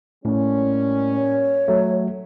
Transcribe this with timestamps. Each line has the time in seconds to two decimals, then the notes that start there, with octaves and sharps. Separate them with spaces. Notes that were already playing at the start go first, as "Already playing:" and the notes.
0.25 A2 G3 A#3 C#4
1.13 C#5
1.68 F#3 A3